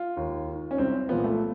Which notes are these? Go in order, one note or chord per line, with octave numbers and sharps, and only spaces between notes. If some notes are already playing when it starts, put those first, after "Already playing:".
Already playing: F4
D#2
D#3
C#4
C2 C4
A#2 F3 B3
A3